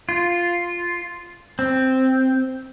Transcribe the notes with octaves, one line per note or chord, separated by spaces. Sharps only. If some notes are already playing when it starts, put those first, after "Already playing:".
F4
C4